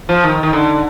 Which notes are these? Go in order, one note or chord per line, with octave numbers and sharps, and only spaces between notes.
F3
D#3
D#3
D3